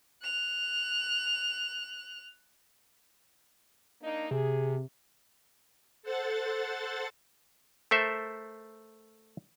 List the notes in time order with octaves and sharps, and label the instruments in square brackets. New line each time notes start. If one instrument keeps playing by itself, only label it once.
[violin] F#6 F7
[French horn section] A#3 D4 D#4
[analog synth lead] C3 [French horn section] G#4
[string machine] A4 C5 F#5 A6
[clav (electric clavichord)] A3 A4 A#4 C5 E5